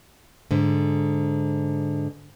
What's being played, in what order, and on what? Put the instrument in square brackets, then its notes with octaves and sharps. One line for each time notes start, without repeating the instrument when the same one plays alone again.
[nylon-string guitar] G#2 D3